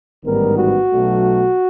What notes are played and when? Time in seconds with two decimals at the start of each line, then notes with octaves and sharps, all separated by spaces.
0.24 A1 G#2 D#3 G3 B3 A#4
0.57 F#4
0.91 B1 B2 F#3 A3